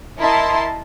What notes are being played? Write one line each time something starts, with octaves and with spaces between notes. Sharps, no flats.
E4 A#4 D#5 A5 C6